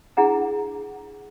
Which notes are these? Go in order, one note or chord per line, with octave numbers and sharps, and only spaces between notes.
D4 E4 G#4 F#5 A#5